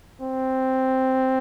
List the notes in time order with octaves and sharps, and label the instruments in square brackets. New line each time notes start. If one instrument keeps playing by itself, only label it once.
[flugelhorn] C4